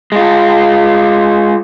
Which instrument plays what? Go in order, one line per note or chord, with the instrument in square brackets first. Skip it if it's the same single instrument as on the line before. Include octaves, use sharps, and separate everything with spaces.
[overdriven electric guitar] G#3 F4